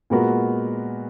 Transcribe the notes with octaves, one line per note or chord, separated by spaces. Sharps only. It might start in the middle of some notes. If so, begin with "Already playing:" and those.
A#2 G#3 B3 F#4 A#4